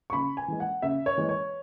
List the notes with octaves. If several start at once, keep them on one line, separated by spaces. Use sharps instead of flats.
C#6
C#3 B5
G#5
E3 G#3
F#5
C#3 E5
C#5
E3 G#3
C#5